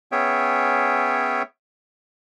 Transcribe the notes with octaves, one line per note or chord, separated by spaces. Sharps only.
B3 C#4 G#4 C#5 E5 G5